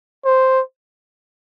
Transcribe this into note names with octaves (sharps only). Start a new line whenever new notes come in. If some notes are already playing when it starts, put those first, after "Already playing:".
C5